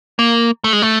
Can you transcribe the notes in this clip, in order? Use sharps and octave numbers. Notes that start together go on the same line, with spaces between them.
A#3
A3
G#3
A3